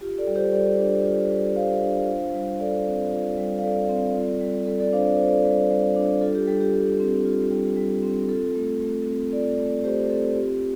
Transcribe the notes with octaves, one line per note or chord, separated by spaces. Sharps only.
F4 G4
A4 D5
G3
G4 C5
G3 A4 D5
D4
F4
G3
G3 C5 F5
D4
F4
G3
G3 A4 D5
C4
F4
G3
F5
G3 A4 D5
C4
F4
G3
G3 A4
A4 D5
D4 C5 F5
D5
F4 C5
A4 D5
G3
G3
D4
F4 A4
G4
G3 A4
G4
G3 A4
C4
F4
G3
G3
C4
F4 A4
A3
A3
C4
F4 A4 D5
A3
A3 G4 C5
C4 A4
F4 G4